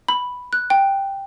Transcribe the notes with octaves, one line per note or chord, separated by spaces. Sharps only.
B5
F#6
G5